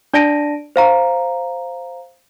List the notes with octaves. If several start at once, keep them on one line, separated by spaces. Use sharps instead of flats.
D4 D5 A5 A#6 D7 D#7
C5 F5 A#5